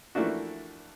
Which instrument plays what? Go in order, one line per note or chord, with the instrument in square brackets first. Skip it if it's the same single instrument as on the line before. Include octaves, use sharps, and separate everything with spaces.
[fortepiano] E3 F3 A3 A#3 D4 F#4